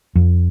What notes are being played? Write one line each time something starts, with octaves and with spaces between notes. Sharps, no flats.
F2